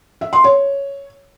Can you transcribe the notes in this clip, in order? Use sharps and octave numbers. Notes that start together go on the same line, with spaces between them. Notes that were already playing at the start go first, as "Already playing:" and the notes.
E5
C6
C#5